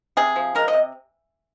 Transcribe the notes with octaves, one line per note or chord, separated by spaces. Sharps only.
C3 G#4
F3
G#3 A#4
D#5
C3